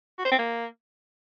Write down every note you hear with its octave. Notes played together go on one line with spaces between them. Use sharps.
F#4
C5
C4
A#3